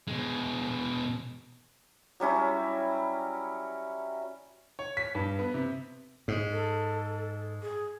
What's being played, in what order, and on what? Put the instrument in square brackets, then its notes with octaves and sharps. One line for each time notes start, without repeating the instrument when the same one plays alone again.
[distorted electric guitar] B2 G#3
[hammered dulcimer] F#3 G3 C#4 E4
[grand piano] C#5
B6
G2
B3
C3
[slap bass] G#2
[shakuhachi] A4
G#4